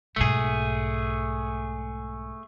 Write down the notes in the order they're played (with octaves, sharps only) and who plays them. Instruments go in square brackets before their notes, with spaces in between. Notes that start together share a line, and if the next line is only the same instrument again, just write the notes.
[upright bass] B1 G#2 [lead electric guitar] A3 G#4